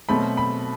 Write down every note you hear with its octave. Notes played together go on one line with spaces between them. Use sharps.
B2 F#3 A3 C4 B5
B5